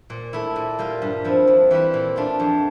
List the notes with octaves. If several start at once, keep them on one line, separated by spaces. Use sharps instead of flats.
A#2
A3 E4
A#2
G3 A#3 F4
G2
F3 C4 E4
F2
E3 G3 C4 E4
A#2
A3 D4 F4
F2